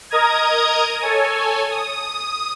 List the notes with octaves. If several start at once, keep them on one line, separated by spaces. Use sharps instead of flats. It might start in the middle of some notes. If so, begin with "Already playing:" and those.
A#4 D#5 A#5 D#6 G#6
A4 C#5 G#5
D#6